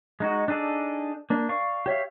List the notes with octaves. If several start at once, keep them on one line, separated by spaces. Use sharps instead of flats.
G#3 D#4 F#4
D4 D#4 G#4 A4 D5
A#3 D4
D5 F5 C#6
G4 C#5 E5 F5